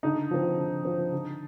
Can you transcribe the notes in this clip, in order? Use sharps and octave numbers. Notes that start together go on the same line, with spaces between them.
D3 D#4
F3 C4
D3
F3 C4
D3